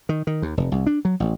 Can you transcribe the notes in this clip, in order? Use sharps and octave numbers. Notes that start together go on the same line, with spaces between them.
D#3
D#3
D#2
F1
C2
D4
F#3
A1